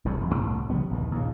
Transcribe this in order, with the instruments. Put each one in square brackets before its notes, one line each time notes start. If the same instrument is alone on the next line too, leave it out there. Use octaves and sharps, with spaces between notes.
[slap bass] E1 C2 G#2 F#3
E1 F2
C2 A2
C#3 F3 G3 B3
A#1 D#2 E3
D#2 A#2 C#3